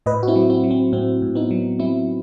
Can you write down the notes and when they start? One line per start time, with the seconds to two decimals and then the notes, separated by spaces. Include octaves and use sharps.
0.06 A2 B4 D#5
0.23 F#4
0.28 C4 E4
0.36 F#3
0.50 C4 E4
0.63 F#3
0.71 C4
0.92 A2 C4
1.22 A2
1.35 B3 D#4
1.51 F#3
1.79 F#3 C4 E4